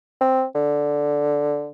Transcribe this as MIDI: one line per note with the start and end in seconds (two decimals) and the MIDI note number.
0.21 0.45 60
0.55 1.70 50